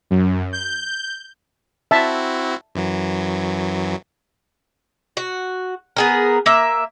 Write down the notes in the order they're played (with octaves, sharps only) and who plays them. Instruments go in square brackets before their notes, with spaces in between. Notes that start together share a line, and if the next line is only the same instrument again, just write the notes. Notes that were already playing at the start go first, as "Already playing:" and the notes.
[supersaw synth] F#2
G6
[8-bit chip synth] C4 E4 F#4 [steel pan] E5 A5
[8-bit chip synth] F#2 E3 F#3
[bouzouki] F#4
B3 G#4 A#4
A#3 E5